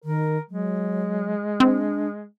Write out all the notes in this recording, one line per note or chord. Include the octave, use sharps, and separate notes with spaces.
D#3 A#4
F#3 G#3
C4 D4